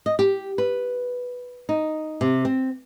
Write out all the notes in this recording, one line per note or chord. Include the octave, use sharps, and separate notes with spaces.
D#5
G4
B4
D#4
C3
C4